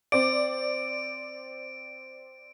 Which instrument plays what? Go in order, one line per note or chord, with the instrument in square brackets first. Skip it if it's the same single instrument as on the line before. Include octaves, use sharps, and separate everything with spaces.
[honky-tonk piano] C4 D5 [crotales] D7